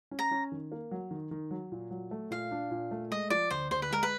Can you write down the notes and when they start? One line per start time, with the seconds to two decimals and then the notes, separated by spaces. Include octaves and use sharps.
0.11 C#4
0.19 A#5
0.31 C#4
0.52 D#3
0.72 A#3
0.91 F#3
1.11 D#3
1.31 D#3
1.51 F#3
1.72 A#2
1.91 F#3
2.11 A3
2.31 A#2 F5
2.51 D4
2.71 A#2
2.91 A3
3.11 G#3 D#5
3.30 F3 D5
3.50 D2 C5
3.71 D2 C5
3.82 B4
3.91 G#3 A#4
4.03 B4